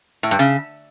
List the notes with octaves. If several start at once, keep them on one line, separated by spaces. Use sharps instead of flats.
A2
G2
C#3